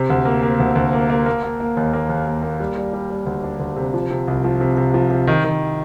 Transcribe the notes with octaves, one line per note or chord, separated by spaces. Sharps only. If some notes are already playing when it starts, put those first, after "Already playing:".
Already playing: C3
D2
A#3
A#3
D2
D2
A#3
A#3
A#3
A#3
A#3
D#2
A#3
D#2
A#3
A#3
G3
G3
G3
G3
D2
D4
D2
C3
F3
C3
C2
F3
C3
C3
F3
C3
D#3
D#3